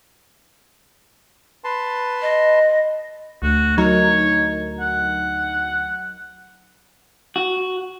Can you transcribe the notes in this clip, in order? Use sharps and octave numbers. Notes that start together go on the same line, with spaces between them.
B4 A5 C6
D#5
D2 F#4
F#3 D#4 A#4 C#5
F#5
F#4